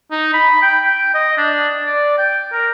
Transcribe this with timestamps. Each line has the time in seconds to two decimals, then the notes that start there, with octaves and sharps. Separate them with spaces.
0.11 D#4
0.34 B5
0.62 G5
0.85 G5
1.14 D#5
1.38 D4
1.85 D5
2.18 G5
2.53 A#4